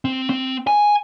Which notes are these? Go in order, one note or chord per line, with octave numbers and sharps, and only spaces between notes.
C4
C4
G#5